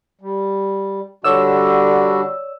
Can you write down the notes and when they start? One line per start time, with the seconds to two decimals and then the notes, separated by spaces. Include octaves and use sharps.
0.21 G3
1.24 D3 G3 D4 F#4 C#5 D5 E6